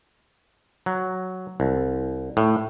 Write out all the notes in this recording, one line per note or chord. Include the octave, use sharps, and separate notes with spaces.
F#3
C2
A2